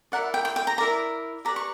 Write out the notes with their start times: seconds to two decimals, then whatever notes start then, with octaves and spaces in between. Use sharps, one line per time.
0.12 E4 A#4 D5 F#5
0.34 G5
0.45 G5
0.56 G5
0.67 A#5
0.78 E4 A#4 D5 A#5
1.45 G4 B4 D5 A#5
1.56 C#6